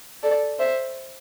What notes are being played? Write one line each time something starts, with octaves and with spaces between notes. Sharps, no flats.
A4 D5
C5 E5